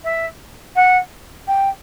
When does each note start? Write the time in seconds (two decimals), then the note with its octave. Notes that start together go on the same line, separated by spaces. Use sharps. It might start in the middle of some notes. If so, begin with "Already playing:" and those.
0.04 E5
0.75 F#5
1.47 G5